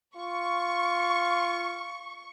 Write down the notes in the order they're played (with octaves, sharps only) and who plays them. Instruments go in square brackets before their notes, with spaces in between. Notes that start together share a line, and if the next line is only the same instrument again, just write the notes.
[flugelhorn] F4 [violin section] C#6